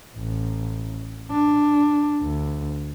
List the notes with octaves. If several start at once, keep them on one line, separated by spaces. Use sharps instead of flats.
A1
D4
D2